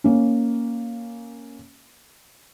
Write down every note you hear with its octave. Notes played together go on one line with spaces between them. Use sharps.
A#3 C#4